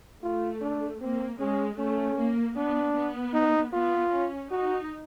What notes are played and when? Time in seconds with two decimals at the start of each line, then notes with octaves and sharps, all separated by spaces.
0.23 A3 F4
0.61 D4
1.01 A#3 C4
1.39 G#3 C#4
1.78 A3 C#4
2.18 A#3
2.56 B3 D4
2.95 B3
3.34 D#4
3.73 B3 F4
4.12 C#4
4.51 D#4 F#4